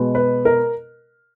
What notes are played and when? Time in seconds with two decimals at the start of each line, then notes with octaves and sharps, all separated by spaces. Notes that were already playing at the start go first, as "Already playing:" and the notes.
Already playing: B2 G#3 B3
0.15 B4
0.45 A#4